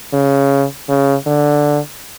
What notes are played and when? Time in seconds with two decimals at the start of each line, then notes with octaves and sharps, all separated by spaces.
0.13 C#3
0.89 C#3
1.26 D3